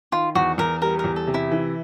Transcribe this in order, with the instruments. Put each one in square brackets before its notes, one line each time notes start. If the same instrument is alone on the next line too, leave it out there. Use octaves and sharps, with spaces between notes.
[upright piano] D#3 [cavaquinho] F4
[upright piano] E2 [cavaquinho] F#4
[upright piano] E2 [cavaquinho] A#4
[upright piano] G3 [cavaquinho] A#4
[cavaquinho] A#4
[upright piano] E2
[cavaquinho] A4
[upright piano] C3
[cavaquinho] E4
[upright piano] E3